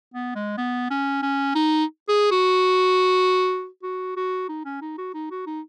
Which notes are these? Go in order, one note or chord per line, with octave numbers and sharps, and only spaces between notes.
B3
G#3
B3
C#4
C#4
D#4
G#4
F#4
F#4
F#4
D#4
C#4
D#4
F#4
D#4
F#4
D#4